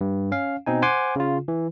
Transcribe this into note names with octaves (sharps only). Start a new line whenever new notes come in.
G2
C#4 F5
B2 C4 D#4 G#5
C5 F#5 G#5 C6 D6
C#3 F4
E3